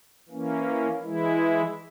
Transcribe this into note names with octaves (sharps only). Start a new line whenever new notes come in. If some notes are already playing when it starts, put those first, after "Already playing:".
E3 A#3 C#4
E3 G#3 E4